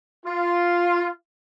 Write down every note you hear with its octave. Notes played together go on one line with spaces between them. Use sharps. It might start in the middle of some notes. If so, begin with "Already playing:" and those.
F4